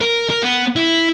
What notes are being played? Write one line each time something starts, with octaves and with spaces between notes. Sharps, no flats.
A#4
A#4
B3
E4